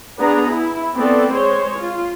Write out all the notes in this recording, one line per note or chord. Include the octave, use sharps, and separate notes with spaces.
B3 D4 G#4 A#5
E4
B3 C4 A4 D5
G#3 C5 C#5
F4